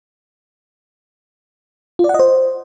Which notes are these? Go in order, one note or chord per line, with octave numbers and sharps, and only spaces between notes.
F4
D5
F#5
D#5
C5